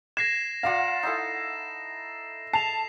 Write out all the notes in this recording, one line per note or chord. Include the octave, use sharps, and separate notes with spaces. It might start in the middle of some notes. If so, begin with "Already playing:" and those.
G#6 A#6 C7 E7
F4 D5 F5 F#5 A#5
D#4 E4 A4
A5 C7 F7